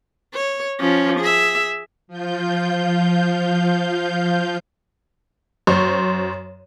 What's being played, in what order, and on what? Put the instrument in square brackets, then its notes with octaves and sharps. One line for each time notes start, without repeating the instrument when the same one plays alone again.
[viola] C#5
F3 C#4
G#4 E5
[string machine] F3 F4 G6
[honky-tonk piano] F#2 C5 C6 C#6